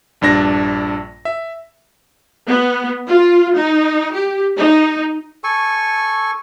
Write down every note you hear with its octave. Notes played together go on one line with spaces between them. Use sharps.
A#1 G2 D4 A#6
E5
B3
F4
D#4
G4
D#4
A4 G#5 C#6